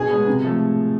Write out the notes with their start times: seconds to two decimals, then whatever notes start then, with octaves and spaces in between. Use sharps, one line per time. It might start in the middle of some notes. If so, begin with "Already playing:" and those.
Already playing: B2 G#4 G#5
0.10 G#3 B3
0.27 C3
0.44 F3 A3